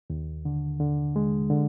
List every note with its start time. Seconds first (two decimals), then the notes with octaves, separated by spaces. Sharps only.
0.10 D#2
0.45 D3
0.80 D3
1.16 G#3
1.50 D3